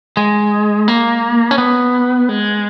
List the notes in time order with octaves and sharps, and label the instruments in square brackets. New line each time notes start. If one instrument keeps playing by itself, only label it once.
[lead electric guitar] G#3
A#3
C#4
B3
G#3